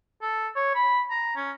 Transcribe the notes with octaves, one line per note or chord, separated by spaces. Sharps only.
A4
C#5
B5
A#5
C#4